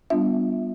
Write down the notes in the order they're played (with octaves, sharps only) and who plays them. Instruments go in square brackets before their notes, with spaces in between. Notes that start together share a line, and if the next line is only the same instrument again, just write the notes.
[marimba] G3 B3 D4 F4 E5